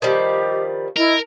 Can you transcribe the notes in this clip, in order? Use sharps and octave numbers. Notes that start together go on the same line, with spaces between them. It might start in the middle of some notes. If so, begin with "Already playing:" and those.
D#3 F3 G3 G4 D#5
E4 A#4 D#5